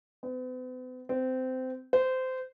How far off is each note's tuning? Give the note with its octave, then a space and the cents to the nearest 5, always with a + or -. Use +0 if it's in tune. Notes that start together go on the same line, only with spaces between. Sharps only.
B3 +45
C4 -20
C5 -20